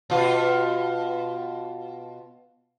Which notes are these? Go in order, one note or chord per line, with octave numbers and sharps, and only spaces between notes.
B2 F4